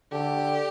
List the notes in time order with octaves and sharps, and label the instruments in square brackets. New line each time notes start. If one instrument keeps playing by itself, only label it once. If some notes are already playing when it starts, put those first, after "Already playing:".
[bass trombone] D3 [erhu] G4